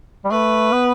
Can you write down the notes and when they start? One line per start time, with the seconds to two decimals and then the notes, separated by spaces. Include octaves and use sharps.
0.25 G3
0.30 A3 B4
0.72 B3